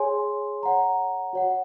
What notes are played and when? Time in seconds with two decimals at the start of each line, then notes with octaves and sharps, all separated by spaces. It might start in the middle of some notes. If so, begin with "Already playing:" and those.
Already playing: G#4 C#5 G#5 C6
0.63 C#5 F#5 A#5
1.33 F#4 C#5 F#5